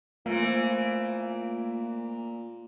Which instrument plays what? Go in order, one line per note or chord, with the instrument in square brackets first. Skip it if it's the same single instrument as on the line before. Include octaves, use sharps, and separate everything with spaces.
[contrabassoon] A#2 [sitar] E3 C4 [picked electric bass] A3 A#3 [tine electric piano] F4 F5